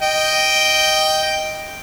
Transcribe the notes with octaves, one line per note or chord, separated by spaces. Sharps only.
D#5 G5